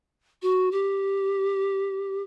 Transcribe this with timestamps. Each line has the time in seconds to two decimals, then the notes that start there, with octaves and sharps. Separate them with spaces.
0.42 F#4
0.72 G4